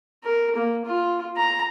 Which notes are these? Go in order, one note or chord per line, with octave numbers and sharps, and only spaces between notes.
A#4
A#3
F4
A#5